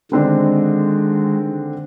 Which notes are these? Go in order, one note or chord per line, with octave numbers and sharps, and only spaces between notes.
D3 D#3 G#3 C4 D4